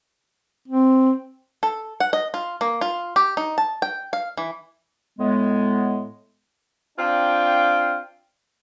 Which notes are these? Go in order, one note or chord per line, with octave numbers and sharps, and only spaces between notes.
C4
A4
F#5
D#5
F4
A#3
F4
G4
D#4
A5
G5
F5
E3
A2 G#3 B3
C4 D4 F4 F5 G5